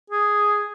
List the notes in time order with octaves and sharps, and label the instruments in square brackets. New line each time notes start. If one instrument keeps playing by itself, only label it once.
[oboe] G#4